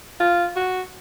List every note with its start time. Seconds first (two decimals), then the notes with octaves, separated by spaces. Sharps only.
0.20 F4
0.56 F#4